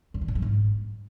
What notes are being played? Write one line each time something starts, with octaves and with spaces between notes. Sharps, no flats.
F#2
D#3
G#2
F#3
G#2